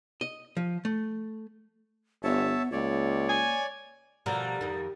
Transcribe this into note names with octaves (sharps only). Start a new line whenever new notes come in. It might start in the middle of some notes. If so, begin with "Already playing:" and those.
D#5
F3
A3
G1 B3 C#5 E5 A5
C#2 A#3 C#5 D5
G#5
B2 D3 F3 G3 A#4 E5
F2 D#3